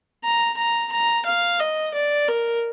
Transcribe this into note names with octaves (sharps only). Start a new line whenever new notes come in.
A#5
A#5
A#5
F5
D#5
D5
A#4